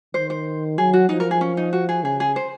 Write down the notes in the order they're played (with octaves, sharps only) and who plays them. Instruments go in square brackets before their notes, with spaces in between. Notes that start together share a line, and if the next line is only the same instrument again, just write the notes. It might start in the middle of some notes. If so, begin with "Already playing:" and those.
[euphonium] D#3 [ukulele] C5
[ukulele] C5
[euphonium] F#3 [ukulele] G#4
[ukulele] F#4
[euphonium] F3 [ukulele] D#4
[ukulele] A#4
G#4
C#4
D#4
F#4
G#4
[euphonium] C#3 [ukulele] G#4
[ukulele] G#4
C5